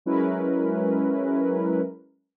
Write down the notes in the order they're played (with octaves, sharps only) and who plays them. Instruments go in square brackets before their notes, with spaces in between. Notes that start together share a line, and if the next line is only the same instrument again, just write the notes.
[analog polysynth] F#3 G#3 C#4 E4 A#4 B4